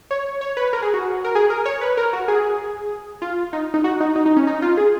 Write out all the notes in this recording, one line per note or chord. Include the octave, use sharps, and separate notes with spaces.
C#5
C#5
B4
A#4
G#4
F#4
A#4
G#4
A#4
C#5
B4
A#4
F#4
G#4
F4
D#4
D#4
F#4
D#4
D#4
D#4
C#4
D#4
F4
G#4